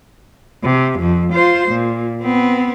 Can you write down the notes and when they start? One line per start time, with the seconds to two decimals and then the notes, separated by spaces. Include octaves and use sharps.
0.64 C3
1.00 F2
1.33 F4 C5
1.69 A#2
2.22 B3 C4